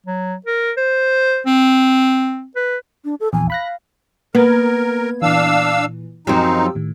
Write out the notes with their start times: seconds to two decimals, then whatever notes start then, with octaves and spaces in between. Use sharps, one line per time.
0.06 F#3
0.46 A#4
0.77 C5
1.46 C4
2.56 B4
3.05 D4
3.20 A4
3.33 A#1 E2 G#5
3.50 F5 B5 F#6 A#6
4.35 A#3 B3 A#4 G#6
5.22 A#2 E3 D4 F5 E6
6.27 F#2 F3 C4 D#4 G4 E6
6.75 A2 D#3